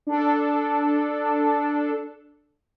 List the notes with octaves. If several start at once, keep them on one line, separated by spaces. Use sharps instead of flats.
D4 A4